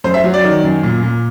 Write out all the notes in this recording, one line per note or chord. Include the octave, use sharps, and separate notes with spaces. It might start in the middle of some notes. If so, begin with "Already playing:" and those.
F#2 C5
E5
F#3
D5
D#3
F#2
A#2
A#2